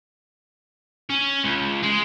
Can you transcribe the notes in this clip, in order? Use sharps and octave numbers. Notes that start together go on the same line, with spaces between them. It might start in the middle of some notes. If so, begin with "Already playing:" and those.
C#4
C#2
G#3